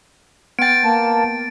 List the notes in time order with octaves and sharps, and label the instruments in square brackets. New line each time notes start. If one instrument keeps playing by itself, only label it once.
[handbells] B3 G5 [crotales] A6 D7
[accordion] A#3 A5